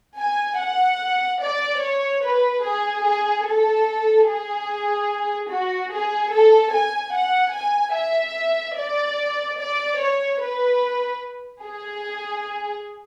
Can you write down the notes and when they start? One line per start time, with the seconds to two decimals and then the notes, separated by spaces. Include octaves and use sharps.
0.19 G#5
0.61 F#5
1.42 D5
1.83 C#5
2.24 B4
2.65 G#4
3.05 G#4
3.47 A4
4.28 G#4
5.51 F#4
5.92 G#4
6.33 A4
6.73 G#5
7.14 F#5
7.55 G#5
7.97 E5
8.78 D5
9.60 D5
10.01 C#5
10.42 B4
11.64 G#4